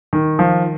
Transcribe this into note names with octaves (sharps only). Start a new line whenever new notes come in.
D#3
F3